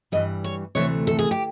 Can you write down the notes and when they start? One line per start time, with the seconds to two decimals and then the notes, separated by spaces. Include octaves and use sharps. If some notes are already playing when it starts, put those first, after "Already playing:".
0.12 G2 E3 G3 D#5
0.44 C#5
0.75 D2 C3 E3 A3 C#5
1.07 A4
1.19 G#4
1.31 G4